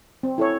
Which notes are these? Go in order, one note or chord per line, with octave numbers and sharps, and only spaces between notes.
C4
E4 A4 C#5